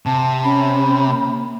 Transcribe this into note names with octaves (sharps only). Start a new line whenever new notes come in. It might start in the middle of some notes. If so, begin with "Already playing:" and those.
C3 A5
C#4 B5
A#3